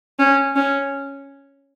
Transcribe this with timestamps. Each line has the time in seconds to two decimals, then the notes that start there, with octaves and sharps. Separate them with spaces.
0.19 C#4
0.56 C#4